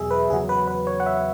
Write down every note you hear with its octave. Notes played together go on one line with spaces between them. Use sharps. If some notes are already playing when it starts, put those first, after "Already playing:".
Already playing: E2 B2 F#3 G#4 E5
B4
E2 C#3 F#3 G#4
B4
B4
C#5
F#5
E5